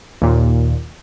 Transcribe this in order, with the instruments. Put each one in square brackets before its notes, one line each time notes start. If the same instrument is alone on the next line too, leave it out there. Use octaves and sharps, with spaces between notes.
[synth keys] D#2 A#2